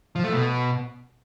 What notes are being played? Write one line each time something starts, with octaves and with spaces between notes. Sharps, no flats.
F3
A3
B2